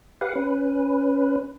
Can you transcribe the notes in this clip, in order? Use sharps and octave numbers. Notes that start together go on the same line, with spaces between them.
G4 B4 F5 F#5
C#4 B4